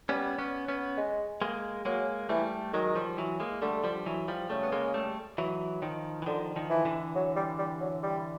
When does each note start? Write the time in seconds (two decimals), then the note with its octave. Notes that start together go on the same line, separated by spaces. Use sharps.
0.09 G3 B3 C#4
0.39 B3 C#4
0.68 B3 C#4
0.97 G#3
1.42 G#3 A#3
1.85 F#3 G#3 A#3
2.29 E3 G3 A3
2.73 D#3 F#3 G#3
2.95 F3 G3
3.18 E3 F#3
3.40 G#3 A#3
3.62 D3 G3 A3
3.84 F3 G3
4.06 E3 F#3
4.28 F3 G3
4.50 C#3 G3 A3
4.63 B3
4.72 G#3 A#3
4.94 G3 A3
5.38 E3 F#3
5.82 D#3 F3
6.22 E3
6.26 D3 D#3 F3
6.56 D#3 F3
6.70 E3
6.85 D3 E3
7.15 F#3
7.36 G3
7.59 G3
7.80 F#3
8.03 G3